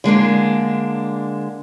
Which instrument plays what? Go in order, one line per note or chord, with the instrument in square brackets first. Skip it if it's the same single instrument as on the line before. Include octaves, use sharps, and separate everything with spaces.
[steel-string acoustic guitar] D3 G#3 A#3 D4